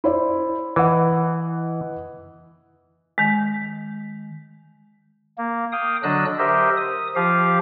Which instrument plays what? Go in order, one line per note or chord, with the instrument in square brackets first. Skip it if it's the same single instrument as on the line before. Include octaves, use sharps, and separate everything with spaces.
[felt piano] E4 C5 D5
[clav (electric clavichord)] E3 [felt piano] B4 D#5 F#5
[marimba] D#3 G#3
[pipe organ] A#3
F5 G5 D#6
D3 F#3 D4 D#5 E6 F#6
G4 A#4 C5 D#5 E5
D#6
F3 G4 F5